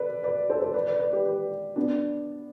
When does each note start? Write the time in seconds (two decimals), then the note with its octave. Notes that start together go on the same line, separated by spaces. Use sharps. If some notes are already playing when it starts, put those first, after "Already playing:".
Already playing: A4 B4 D5
0.23 B4 D5
0.50 A4 C5
0.62 A4 C5
0.74 B4 D5
0.87 B4 D5
0.99 B4 D5
1.13 G4 B4
1.25 G4 B4
1.76 B3 D4